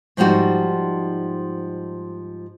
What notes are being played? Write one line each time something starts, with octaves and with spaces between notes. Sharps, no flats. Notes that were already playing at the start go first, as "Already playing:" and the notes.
G#2 F3 G3 D#4 F#4